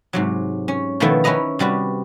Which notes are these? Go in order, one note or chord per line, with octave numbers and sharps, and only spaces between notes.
G#2 C3 F#3
C#4
B2 D#3 F3 A3 B3 E4
C#4 E4 B4 D#5 A#5
C3 G3 F#4 B4